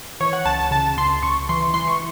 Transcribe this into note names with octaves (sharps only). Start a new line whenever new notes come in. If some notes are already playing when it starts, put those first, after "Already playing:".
E3 C#5
F#5
C#2 A5
A5
C#3 A5
C#2 C6
C#2 C#6
E3 C6
E3 C6
C#6